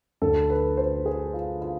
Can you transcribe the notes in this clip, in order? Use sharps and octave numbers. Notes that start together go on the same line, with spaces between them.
D2 D3 A4
B4
C5
G#4
F4
F4